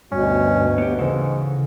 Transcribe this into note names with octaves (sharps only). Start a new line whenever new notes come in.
D2 G2 B2 C#4
B3 G4
G#2 C#3 E3 A4